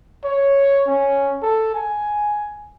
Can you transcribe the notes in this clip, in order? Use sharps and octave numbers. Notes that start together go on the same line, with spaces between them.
C#5
C#4
A4
G#5